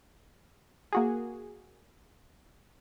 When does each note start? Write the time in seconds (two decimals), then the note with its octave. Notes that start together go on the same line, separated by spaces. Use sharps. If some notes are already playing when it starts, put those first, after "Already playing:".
0.93 A#3 F#4 G#4